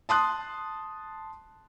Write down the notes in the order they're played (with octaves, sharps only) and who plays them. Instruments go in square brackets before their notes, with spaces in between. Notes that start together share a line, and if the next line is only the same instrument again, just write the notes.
[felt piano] A5 C6 D#6 F#6